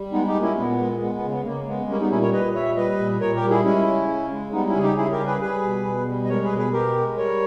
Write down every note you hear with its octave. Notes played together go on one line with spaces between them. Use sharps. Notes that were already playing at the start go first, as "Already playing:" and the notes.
Already playing: G3
G#3 B3 D#4
D#4 G4
A#2
C#4 E4
A#2 B3
G#3
G#3 B3
B3
C#3
B3
C#3 A#3
G#3 B3
G3 A#3 C#4
B3 D#4
A#2 C#4 E4
A#4 C#5
A#2 B4 D#5
G3 C#5 E5
G3 B4 D#5
A#2
A#2 A#4 C#5
G4 A#4
G3
E4 G#4
G#3 C#4 E4
C#3
C#3
G#3
G3 B3 D#4
C#4 E4
C#3 G#4
D#4 G4
C#3 E4 G#4
G4 A#4
G3
G#4 B4
G3 G#4 B4
B2
B2
G3
D#5
G#3 A#4 C#5
G#4 B4
B2
G#4 B4
B2 G4 A#4
G#3
G3 A#4 C#5